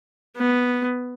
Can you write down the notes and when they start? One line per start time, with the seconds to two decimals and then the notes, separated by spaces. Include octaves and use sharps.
0.37 B3